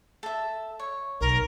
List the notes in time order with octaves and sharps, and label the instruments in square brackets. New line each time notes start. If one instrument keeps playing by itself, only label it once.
[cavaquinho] A4 E5
C#5
[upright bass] B1 [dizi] A#4